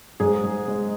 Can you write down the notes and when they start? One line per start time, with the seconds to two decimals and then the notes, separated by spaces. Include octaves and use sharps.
0.20 G#2 G#4
0.43 G#2
0.68 G#3